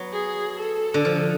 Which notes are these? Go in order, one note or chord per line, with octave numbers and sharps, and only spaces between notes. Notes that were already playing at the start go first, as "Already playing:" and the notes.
Already playing: F#3 B3
G#4
A4
D3
F3